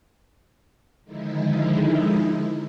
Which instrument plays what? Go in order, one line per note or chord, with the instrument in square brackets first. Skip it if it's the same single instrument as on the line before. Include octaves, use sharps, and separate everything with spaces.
[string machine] D3 D#3 F3 G#3 D#4 E4